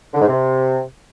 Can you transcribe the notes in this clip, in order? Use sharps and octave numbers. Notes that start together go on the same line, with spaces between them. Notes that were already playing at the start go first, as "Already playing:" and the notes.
D3
G#2
C3